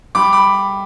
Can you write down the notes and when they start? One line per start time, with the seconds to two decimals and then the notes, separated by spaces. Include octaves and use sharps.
0.15 G3 B5 D6
0.33 B5 D6